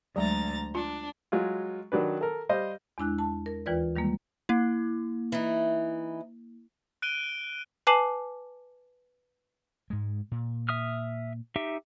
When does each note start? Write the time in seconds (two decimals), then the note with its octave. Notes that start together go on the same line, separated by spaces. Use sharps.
0.16 D2 F#3 G#3 A#5 A6
0.75 D4 F4
1.32 F#3 G#3 F4
1.92 D#3 F#3 D4 B4
2.21 A4 A#4
2.49 G3 C5 D#5 F5
2.98 E2 G#3 D4 E4 F#6
3.19 A5
3.46 A#4
3.66 D#2 E3 F4 B4 D5
3.96 D#3 G3 G#3 A#3
4.49 A#3 E4
5.32 E3 D#4
7.02 F#6 D7 D#7 G7
7.87 B4 G#5 A5 D6 C7 F#7
9.90 G#2 G#3
10.32 A#2
10.69 E5 D#6 F6
11.56 D#4 G4 E5